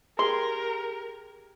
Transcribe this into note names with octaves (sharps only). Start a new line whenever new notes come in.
G4 G#4 A#4 C6